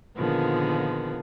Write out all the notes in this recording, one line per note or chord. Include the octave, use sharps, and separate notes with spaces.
A#2 D3 D#3 F3 B3 G#4